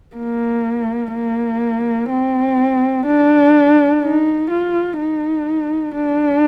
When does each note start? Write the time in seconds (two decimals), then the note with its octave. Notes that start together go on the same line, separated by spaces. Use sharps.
0.17 A#3
1.13 A#3
2.09 C4
3.06 D4
4.02 D#4
4.51 F4
4.99 D#4
5.95 D4